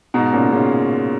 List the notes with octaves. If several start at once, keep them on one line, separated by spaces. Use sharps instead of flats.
G#2 B2
A#2 C#3
A#2 C#3